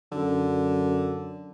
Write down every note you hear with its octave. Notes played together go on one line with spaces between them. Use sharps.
F#2 D3